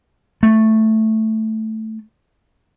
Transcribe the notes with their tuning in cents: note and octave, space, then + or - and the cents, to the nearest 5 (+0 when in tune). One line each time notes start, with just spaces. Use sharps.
A3 +0